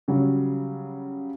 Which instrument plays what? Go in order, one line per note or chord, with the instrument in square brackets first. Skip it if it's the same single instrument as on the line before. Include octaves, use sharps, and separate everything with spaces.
[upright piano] C#3 F#3 G3